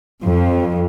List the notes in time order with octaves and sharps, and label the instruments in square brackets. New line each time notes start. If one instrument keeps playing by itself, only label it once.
[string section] F2